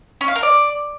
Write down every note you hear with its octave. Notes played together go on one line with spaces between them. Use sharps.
C#4
F5
A#4
D5